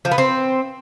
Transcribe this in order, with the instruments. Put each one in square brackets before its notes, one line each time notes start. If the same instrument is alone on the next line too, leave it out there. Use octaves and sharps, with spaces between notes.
[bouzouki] F3
B3
C4